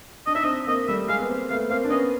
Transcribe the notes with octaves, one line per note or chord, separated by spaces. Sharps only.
D4 D#5
D#4 E5
C4 D4 D#5
A#3 C4 D#5
G3 A3 E5
G#3 A#3 F5
B3
A#3 C4
A3 B3 F5
A#3 C4 F5
D4
B3 C#4 D#5